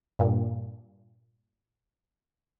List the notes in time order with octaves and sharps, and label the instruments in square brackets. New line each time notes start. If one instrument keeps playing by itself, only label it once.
[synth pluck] G2 A#2